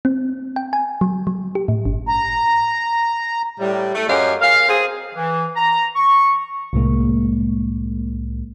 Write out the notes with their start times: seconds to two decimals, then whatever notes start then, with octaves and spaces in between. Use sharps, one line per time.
0.05 C4
0.56 G5
0.73 G#5
1.01 F#3
1.27 F#3
1.55 G4
1.68 A2
1.85 G1
2.08 A#5
3.59 A2 G3
3.95 A3
4.08 F#2 C#4 G4 D#5 F5
4.42 G#4 A#4 F5
4.68 C4 G#4
5.14 E3
5.56 A#5
5.95 C#6
6.73 C2 A2 G#3 A#3